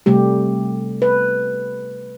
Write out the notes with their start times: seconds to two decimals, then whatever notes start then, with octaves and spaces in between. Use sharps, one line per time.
0.06 C3 G3 A3 G4
1.02 B4